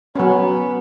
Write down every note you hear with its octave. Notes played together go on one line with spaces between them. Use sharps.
F#3 B3 C#4